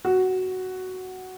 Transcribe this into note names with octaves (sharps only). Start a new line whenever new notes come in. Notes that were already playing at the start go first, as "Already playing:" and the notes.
F#4